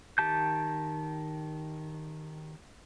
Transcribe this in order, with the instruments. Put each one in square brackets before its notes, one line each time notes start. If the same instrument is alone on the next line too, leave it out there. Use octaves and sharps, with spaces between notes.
[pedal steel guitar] D#3 G4 A5 G6